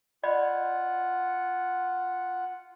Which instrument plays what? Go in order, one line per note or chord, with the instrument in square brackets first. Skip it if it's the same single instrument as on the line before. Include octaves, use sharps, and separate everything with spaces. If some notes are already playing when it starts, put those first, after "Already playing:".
[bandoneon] F4 F#5 [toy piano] D5 D#5 B5